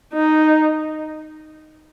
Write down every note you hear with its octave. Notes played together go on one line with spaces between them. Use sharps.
D#4